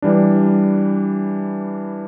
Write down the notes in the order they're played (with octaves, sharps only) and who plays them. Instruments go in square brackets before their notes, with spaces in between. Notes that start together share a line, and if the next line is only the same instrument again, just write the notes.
[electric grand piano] E3 G3 D4